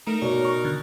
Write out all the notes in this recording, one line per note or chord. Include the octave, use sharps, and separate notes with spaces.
A3 D#4 A#4
B2 C#5 D5
C#6
D3